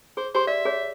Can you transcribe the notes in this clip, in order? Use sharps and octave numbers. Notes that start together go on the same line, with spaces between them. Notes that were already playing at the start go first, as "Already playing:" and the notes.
G#4 C5
G4 G#4 C5 C6
D5 E5
G#4 C#5